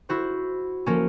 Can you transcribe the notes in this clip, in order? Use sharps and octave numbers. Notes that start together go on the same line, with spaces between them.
E4 F#4 C5
F3 A#3 C#4